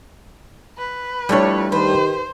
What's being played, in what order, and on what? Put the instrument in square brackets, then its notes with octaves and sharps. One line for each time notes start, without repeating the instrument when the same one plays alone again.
[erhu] B4
[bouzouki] F3 E4 C#5 [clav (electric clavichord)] G3 A3 D4
[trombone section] D#3 G4 [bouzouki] B4 [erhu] C5